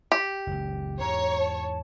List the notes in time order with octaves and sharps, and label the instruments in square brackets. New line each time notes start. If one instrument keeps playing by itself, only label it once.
[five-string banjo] G4
[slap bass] F#1 C#2
[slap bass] E2 G#2 [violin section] C#5 [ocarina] A#5
[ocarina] A5